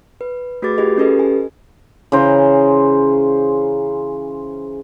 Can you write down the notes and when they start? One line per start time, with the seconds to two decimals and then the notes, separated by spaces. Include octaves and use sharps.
0.21 B4
0.62 A3 F#4 G#4 B4 D6 A6
0.78 F4 G4 G#4 D#5
0.97 C#4 G4 A4 B4 D#5
1.19 G#5
2.12 C#3 E3 C5 A#5